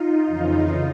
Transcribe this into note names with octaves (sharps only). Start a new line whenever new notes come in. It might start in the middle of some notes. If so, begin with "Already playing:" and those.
Already playing: D#4 F4
F2 C#3 E3